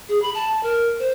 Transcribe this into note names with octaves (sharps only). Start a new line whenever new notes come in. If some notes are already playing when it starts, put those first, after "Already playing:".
G#4
B5
A5
A#4
C5